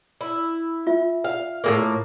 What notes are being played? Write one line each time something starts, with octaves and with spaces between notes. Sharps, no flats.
E4
F4 E5
F5
A2 G#3 A#3